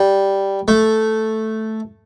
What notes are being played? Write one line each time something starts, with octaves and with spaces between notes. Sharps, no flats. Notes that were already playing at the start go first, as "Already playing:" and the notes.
Already playing: G3
A3